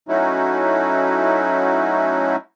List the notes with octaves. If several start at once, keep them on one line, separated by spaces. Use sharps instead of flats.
F#3 A3 C#4 D#4 E4 F#4